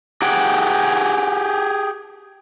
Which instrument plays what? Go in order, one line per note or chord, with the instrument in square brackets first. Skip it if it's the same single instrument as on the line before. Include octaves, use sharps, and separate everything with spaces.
[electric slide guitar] G4 G#4 F#5 G5